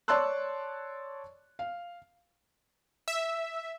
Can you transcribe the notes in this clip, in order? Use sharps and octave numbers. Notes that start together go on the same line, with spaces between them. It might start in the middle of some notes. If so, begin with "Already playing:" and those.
C#5 D5 A5 C6 E6 F#6
F5
E5